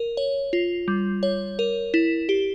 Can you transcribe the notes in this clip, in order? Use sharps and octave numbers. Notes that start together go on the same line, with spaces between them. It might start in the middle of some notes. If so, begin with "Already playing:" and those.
Already playing: A#4
C#5
F4
G3
C#5
A#4
E4
G4